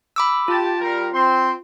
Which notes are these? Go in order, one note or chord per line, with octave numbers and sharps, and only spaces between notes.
B5 D6 E6
F4 G4 A5
G3 A#4
C4 C6